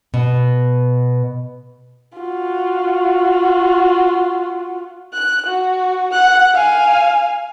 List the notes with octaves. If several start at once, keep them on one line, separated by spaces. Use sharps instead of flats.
B2
F4 F#4
F#6
F#4
F#5 F#6
F5 G#5